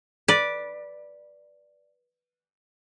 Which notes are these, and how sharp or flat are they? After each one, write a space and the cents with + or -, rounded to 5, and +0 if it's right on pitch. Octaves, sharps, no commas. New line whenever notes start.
B4 -15 D5 +0